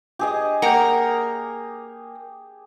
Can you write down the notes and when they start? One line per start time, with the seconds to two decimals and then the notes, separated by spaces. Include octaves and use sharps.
0.19 G4 G#4 D#5
0.62 A#3 A#4 F#5 G5 G6